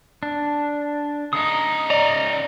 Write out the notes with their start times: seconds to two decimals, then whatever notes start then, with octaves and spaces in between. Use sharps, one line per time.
0.23 D4
1.33 C#3 D#4 D#6
1.90 D5 D#5 A#5